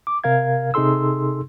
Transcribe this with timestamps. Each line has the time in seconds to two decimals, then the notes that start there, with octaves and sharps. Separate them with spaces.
0.07 D6
0.24 C3 A#4 F5 G#6
0.74 C3 D#4 G#4 A4 C6 E6